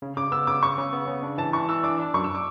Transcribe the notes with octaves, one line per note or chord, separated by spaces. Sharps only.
C#3
C#3 D6
B3 E6
C#3 D6
C#3 C#6
C#3
B3
C#3
D4
E3 A5
E3 C#6
E3 E6
D4 D6
D4
F#2 C#6
E6
D6